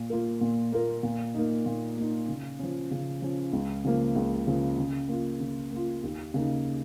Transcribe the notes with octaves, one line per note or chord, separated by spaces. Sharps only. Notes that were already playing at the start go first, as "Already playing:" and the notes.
Already playing: A#2
A#3 F4 A#4
A#2
A#3 F4 A#4
A#2
A#3 D#4
A#2
A#3 D#4
C#3
F3 C#4
C#3
F3 C#4
C#2
C#3 F3 A#3
C#2
C#3 F3 A#3
C#3
A#3 F4
C#3
A#3 F4
D#2
C#3 A#3 D#4